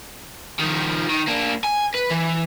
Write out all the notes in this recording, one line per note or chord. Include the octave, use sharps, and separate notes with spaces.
D#3 F3
D#3
A#3 D4
G#5
B4
E3